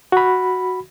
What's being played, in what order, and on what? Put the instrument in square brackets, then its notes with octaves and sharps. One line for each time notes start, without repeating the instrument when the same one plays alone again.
[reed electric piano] F#4 B5